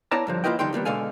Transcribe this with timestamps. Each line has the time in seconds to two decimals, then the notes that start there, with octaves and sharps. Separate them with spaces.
0.11 B3 E4 C#5 D5 A5 A#5
0.27 G2 D3 F3
0.44 A#3 E4 F4 B4 D#5 G5
0.59 E2 D3 G3 D#4 G5 C6
0.73 D#2 G3 A#3 B3
0.85 B2 D3 G#3 A4 F5 G#5